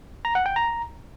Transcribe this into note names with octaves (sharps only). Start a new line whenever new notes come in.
A#5
F#5
G5
A#5